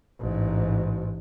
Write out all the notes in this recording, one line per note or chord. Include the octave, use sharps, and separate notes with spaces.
A1 G#2